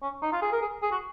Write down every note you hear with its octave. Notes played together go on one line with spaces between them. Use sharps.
C#4
D#4
F4
G#4
A#4
G#4
G#4
F#4